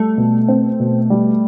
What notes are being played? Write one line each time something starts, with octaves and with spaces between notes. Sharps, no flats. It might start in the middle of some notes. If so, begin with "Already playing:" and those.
Already playing: G3 A3
B2
C4
B2
G3